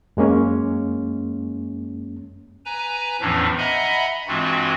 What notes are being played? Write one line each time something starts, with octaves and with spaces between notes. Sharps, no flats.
F#2 G#3 A#3 C#4
B4 G#5 A#5
E2 A2 E3 F3 C#4 D4
D#5 E5 F#5 G#5 A#5 B5
G2 E3 G#3 C4 F4 F#4